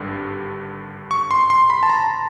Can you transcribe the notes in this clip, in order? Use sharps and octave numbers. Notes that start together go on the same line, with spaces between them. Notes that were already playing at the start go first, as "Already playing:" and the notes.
Already playing: G#1 G2 D3 G3
C#6
C6
C6
B5
A5
A#5